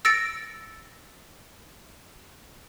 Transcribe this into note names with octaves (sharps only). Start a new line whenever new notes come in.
E6 A6 A#6 C#7 D7